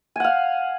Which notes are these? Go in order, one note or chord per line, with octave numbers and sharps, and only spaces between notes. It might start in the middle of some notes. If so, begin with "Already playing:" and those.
F5 F#5 G#5